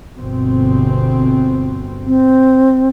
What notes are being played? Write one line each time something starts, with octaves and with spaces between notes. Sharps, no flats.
G1 B2 C4
C4